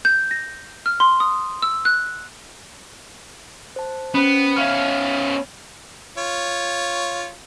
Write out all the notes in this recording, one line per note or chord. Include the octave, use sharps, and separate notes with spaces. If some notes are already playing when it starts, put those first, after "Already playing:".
G6
A#6
F6
C6
D#6
E6
F#6
C5 A5
B3 C#4 C5
B3 C#4 E5 F5 F6
F4 C#5